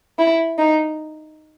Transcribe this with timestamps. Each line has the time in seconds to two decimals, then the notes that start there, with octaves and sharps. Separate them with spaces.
0.19 E4
0.58 D#4